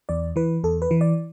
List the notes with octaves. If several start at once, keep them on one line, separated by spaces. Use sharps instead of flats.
E2 D5
E3 B4
E2 A4
B4
E3
D5